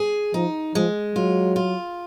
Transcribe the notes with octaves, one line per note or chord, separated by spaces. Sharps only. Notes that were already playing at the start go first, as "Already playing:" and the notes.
Already playing: G#4
F3 D#4
F3 G#3
F#3 F4
F4